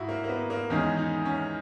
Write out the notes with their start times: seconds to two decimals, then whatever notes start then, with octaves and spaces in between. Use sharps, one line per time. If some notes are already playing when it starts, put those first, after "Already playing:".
Already playing: G#2 E4 F#4
0.09 A#3
0.24 A#3
0.29 B3
0.50 A#3
0.70 E2 D#3 G#3 C#4
0.97 D#4
1.25 C#4